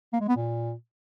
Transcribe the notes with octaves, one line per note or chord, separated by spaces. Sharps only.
A#3
G#3
B3
A#2